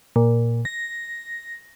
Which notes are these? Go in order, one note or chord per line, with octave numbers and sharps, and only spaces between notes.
A#2
A#6